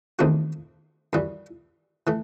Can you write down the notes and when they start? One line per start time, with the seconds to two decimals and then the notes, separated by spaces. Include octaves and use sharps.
0.19 E2 D#3 A3 C4 F#4
1.13 F#2 E3 G3
2.07 E3 A3